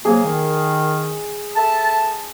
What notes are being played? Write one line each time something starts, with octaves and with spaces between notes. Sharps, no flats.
C3 F#3 A#3 G#4
D#3
A4 E5 A5